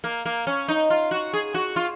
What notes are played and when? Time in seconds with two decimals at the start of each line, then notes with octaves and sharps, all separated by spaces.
0.04 A#3
0.25 A#3
0.47 C#4
0.68 D#4
0.90 F4
1.11 F#4
1.33 G#4
1.54 F#4
1.76 F4